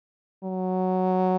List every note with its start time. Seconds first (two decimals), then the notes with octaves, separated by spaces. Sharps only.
0.44 F#3